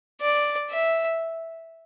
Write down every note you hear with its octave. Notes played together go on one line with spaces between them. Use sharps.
D5
E5